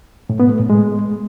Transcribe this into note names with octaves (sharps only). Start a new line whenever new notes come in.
A2
B3
A3
A2
G#3